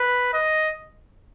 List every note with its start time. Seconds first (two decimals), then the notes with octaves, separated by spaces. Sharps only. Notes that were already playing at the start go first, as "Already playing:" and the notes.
Already playing: B4
0.34 D#5